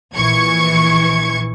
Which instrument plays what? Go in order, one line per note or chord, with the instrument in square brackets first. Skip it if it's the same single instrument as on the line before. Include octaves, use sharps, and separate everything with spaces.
[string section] A#1 E3 C#6 G#6